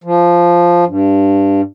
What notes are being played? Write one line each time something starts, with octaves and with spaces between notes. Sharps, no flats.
F3
G2